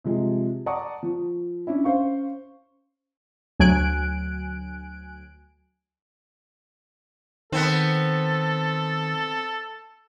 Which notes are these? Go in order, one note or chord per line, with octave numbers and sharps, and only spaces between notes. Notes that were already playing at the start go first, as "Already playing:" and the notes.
C3 F3 G#3
D5 F#5 A5 A#5 C#6 D#6
F3
C#4 D4 E4
C#4 C5 F5 C#6
D2 F#3 G#5 F#6 D7
D#3 B3 C4 A4